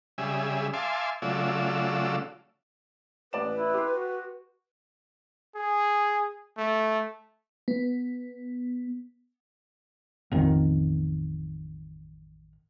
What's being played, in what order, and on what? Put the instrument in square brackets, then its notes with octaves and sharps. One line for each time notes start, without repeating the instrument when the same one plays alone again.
[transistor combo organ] C#3 G3 G#4 E5
E5 F5 G#5 A5 C6 D6
C#3 F#3 A3 F4 D5 E6
[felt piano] A1 D5 E7 [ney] B4
[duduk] E4
[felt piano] G4 C6
[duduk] F#4
[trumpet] G#4
A3
[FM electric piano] B3
[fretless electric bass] A1 F2 D#3